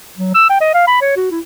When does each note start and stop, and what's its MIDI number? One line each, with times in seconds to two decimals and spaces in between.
0.18 0.32 54
0.34 0.45 88
0.50 0.59 79
0.61 0.72 75
0.74 0.83 77
0.87 0.96 83
1.01 1.14 73
1.16 1.30 66
1.31 1.40 64